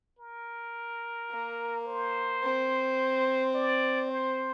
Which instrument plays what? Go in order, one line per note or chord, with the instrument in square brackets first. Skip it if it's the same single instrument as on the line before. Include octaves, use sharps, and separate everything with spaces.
[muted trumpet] A#4
[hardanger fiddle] A#3
[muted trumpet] C5
[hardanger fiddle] C4
[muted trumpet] D5
C5